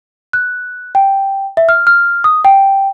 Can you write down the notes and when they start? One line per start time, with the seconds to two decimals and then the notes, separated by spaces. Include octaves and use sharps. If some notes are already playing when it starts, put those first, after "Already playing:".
0.33 F#6
0.95 G5
1.57 E5
1.69 F6
1.87 F6
2.24 D#6
2.45 G5